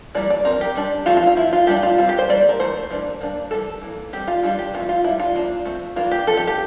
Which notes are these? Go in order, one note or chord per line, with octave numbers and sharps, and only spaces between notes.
E3 G3 A#3 D5
D5
F3 C4 A#4
G4
G3 D4
F3 A3 C4 F4
F4
F4
F3 C4 E4
F4
G3 A#3 D4 G4
F4
G3 C4 F4
G4
C5
E3 G3 A#3 D5
A#4
E3 A3 C5
E3 G3 A#3 D4
G3 A#3 D4
E3 G3 D4 A4
E3 G3 A#3
G3 C4 G4
F4
E3 G3 D4 F4
G4
E3 A3 C4 F4
F4
G3 D4 E4
F4
F3 A#3 D4
F3 A3 C4
E3 A#3 D4 F4
G4
F3 C4 A4
G4
G4